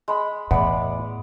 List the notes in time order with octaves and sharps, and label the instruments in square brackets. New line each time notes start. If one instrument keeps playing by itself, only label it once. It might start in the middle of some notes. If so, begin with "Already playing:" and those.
[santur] G#3 B5
[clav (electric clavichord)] E2 [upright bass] A2 [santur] B3 D5